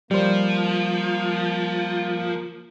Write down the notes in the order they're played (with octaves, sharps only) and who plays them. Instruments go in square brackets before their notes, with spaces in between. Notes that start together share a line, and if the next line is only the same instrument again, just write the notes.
[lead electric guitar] F3 [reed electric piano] G3 C5 [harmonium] A#3